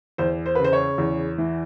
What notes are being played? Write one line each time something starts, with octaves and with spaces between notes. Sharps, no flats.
E2 C5
C5
B4
C#3
C5
C#5
E2
E3